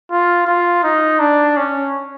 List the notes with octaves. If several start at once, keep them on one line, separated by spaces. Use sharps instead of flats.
F4
F4
D#4
D4
C#4